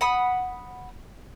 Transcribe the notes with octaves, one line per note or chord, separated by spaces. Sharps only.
F#5 B5 D#6